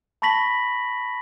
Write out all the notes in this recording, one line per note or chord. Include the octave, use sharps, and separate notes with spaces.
A5 B5 C#6 A#6 B6 F#7